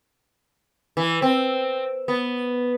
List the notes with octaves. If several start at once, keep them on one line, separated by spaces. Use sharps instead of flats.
E3
C4
B3